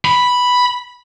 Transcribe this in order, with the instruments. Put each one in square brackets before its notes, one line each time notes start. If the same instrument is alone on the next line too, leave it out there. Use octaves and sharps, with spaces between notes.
[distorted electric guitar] B5